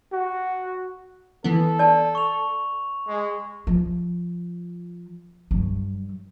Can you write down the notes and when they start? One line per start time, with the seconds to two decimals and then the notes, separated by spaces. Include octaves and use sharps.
0.12 F#4
1.44 E3 B3 A4
1.79 D5 A5
2.15 C#6 F7
3.07 G#3
3.67 F3
5.51 G2 F#3